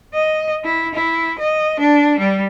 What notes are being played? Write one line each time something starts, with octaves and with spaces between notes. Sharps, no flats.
D#5
E4
E4
D#5
D4
G3